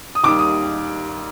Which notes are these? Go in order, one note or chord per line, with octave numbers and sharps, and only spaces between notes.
D#6
D#2 D#3 G3 D6
D#6